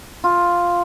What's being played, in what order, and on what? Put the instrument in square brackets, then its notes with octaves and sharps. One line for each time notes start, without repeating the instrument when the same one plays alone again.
[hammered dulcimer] F4